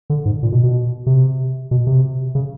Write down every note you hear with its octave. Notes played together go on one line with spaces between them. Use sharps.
D3
G#2
A#2
B2
B2
C3
B2
C3
C#3